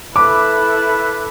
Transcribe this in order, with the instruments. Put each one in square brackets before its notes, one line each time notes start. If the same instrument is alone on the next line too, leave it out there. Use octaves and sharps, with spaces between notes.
[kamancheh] E4 A4 [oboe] B4 [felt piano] D6